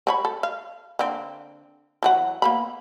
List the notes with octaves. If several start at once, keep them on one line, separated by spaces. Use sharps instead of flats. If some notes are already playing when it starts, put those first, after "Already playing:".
C4 C#5 B5
A4
F5
D3 A#3 C4
E3 F#3 F#5
A#3 B3 B5